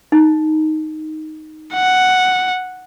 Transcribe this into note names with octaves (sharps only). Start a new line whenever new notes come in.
D#4
F#5